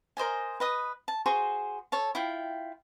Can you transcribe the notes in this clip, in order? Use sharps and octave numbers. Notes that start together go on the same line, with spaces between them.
A#4 C5 D#5 G#5
B4 D#5 D#6
A5
F#4 G#4 C5 C6
A4 C#5 A5
E4 F4 G5